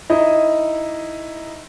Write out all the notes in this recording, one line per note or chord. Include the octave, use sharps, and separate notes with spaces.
D#4 E4 D#5